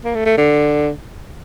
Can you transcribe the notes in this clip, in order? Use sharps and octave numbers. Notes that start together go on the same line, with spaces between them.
A#3
A3
A3
D3